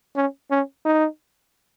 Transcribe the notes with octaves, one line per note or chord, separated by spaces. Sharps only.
C#4
C#4
D#4